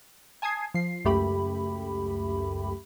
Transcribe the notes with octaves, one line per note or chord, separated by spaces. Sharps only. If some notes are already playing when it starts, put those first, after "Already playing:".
G#5 A5 D#6 G#6 C7
F3 C7
C#2 F#2 A3 G4 B5